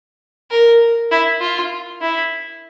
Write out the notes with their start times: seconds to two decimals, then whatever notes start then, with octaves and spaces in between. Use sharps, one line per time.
0.51 A#4
1.12 E4
1.41 F4
2.01 E4